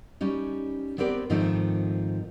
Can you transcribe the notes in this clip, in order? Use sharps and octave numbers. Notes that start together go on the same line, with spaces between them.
G3 C#4 D#4
B3 C4 G4 A#4 D5
G#2 D#3 F3 A3 C4 D#4